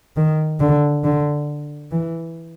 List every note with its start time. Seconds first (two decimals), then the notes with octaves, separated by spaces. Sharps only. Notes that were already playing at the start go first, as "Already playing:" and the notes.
0.16 D#3
0.60 D3
1.04 D3
1.92 E3